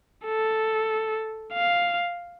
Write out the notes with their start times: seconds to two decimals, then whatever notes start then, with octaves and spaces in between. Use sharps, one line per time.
0.26 A4
1.53 F5